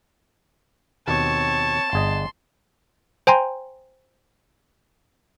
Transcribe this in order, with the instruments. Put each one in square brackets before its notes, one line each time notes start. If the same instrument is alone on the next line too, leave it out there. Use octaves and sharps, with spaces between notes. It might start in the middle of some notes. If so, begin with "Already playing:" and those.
[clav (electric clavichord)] D#2 B2 [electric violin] C4 C#5 [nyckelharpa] A5
[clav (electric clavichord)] G1 G#4 D#5 [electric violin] C6
[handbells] C5 G5 G#5 A#5 C6